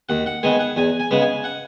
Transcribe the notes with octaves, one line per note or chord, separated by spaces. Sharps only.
D#2 F#5
F#5
D#3 G#3 B3 G#5
F#5
E2 G#5
G#5
C#3 G#3 B3
G#5
F#5